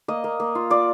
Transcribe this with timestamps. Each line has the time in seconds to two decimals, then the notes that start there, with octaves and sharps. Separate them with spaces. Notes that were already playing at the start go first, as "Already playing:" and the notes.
0.08 A#3 D#5
0.24 A#3
0.40 A#3
0.55 F4
0.70 F4 D5